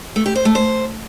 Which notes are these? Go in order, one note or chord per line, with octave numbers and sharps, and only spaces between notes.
A3
G4
C5
A3
C5